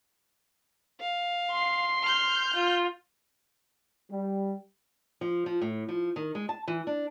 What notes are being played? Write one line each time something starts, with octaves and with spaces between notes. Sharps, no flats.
F5
C6 C7
F6 G6
F4
G3
F3
F3
A2
F3
D#3
G#3
A5
E3
D4